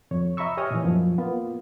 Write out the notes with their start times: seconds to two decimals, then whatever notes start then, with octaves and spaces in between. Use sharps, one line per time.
0.11 F2 C#5
0.37 D#5 E5 A#5 B5 C#6 E6
0.57 G4 C#5 D#5 G#5 D#6 F6
0.71 A#2 E3
0.84 F#2 F3
1.18 A#3 B3 F4